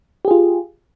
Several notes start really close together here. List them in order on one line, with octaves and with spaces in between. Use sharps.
G4 G#4 F4